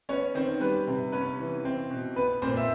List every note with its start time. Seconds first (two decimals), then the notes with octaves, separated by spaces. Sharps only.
0.09 B3 C#4 C#5
0.35 D#3 C4 C5
0.61 G3 B3 B4
0.87 C3
1.12 B3 C#4 B4
1.39 E3
1.65 C4
1.90 B2
2.16 B3 B4
2.42 A#2 C4 C5
2.57 E5